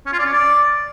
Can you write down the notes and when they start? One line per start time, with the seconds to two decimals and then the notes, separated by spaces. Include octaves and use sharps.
0.06 C#4
0.13 F4
0.19 D5
0.26 C#4
0.32 D5